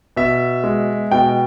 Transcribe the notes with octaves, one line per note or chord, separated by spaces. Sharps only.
B2 E5
G#3
B2 G5